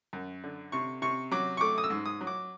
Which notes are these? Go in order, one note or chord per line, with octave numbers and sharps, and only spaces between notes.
F#2
D3
C3 C#6
C3 C#6
F#3 D6
C#6
A3 D6
D#6
E6
G#2
D#6
F#3
D6